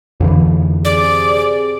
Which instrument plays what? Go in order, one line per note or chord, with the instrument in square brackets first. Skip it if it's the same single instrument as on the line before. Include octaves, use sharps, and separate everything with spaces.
[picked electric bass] F2 D3 E3
[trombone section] C3 G#4 [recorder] D5